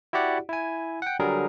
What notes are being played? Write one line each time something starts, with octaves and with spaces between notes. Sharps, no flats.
E4 F#4 G4 D5 F#5
E4 G#5
F#5 G5
D3 F#3 G3 G#4 A#4